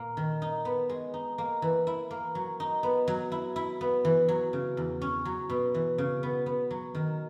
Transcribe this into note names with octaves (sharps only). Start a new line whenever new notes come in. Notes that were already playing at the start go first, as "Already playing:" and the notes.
Already playing: A#2 A#3
D#3
D#4
B3
G#3
D#4
A#3
E3
E4
A#3
F#3
D#4
B3
F#3
E4
E4
B3
E3
F#3
C#3
E2
C#4
F#3
B2
E3
C#3
B3
B3
F#3
D#3